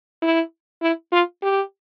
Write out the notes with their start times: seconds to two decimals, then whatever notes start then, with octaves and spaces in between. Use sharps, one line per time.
0.22 E4
0.82 E4
1.12 F4
1.43 G4